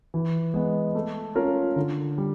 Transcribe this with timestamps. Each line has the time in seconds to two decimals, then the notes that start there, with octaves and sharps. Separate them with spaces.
0.14 E3
0.54 G#3 B3
0.95 A3
1.35 C#4 F4 A#4
1.76 D3
2.18 G3